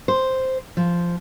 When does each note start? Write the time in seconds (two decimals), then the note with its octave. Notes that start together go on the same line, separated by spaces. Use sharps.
0.08 C5
0.77 F3